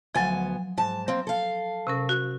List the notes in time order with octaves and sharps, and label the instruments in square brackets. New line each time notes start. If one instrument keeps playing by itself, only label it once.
[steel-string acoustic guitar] D2 B3 G#5 [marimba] F3 F#3
[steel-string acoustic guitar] G#2 A5
A#3 C4
A4 F5
[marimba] C3 C#4 A#4
F#4